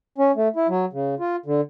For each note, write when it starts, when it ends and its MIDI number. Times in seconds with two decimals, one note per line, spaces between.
0.18 0.32 61
0.36 0.48 57
0.56 0.67 64
0.68 0.85 54
0.93 1.15 49
1.20 1.36 65
1.46 1.61 50